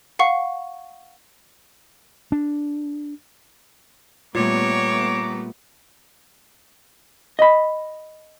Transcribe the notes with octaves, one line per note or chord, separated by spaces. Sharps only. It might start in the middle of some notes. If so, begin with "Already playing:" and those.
F5 F#5 C#6
D4
A#2 G3 A3 B3 C#5 A#5 C#6 D6
D#5 B5